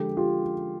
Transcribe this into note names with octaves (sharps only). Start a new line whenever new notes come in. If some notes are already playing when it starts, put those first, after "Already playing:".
Already playing: D3 F3 G#3 G4 A4
F4 G4